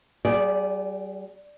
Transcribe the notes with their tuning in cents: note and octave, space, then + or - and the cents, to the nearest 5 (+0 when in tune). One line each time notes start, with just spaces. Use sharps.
G3 -40 G#4 +0 D5 +0